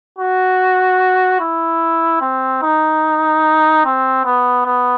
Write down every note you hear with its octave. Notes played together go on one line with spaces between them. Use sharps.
F#4
E4
C4
D#4
C4
B3
B3